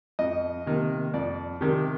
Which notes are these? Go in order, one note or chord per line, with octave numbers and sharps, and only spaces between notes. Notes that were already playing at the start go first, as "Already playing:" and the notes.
F2 D#5
C3 D#3 A#3
F2 D5
C3 D#3 G4